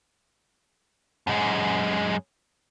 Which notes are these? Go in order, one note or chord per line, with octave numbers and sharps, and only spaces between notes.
F#2 G#3